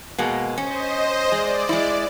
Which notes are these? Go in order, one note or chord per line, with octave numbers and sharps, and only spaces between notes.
B2 G#3 A#3
C#4 C5 D#5
G#3 D5
G#3 E4